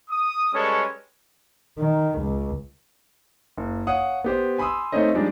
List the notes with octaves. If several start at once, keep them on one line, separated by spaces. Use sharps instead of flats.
D#6
G3 G#3 C#4 A4 B4 C#5
D#3
C#2
F#1
C#5 F5 F#5 D#6
B3 G4 C5
G#5 B5 C6 D#6 E6
A3 C4 C#4 D#4 C5 D#5
F3 G3 G#3 D4 D#4